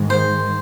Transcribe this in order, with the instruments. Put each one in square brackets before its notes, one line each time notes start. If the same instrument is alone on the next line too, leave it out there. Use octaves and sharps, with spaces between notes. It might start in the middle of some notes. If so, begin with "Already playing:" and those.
Already playing: [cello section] G#2 D#3 G#3
[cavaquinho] C5